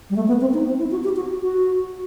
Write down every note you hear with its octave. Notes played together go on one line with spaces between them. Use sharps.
G3
A3
B3
C4
D#4
C4
E4
F#4
G4
F#4
F#4